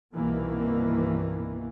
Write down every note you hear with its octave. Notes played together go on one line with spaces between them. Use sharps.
C2 G2 B2 D#3 E3 A#3